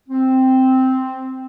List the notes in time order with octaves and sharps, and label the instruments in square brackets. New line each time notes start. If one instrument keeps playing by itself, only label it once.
[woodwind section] C4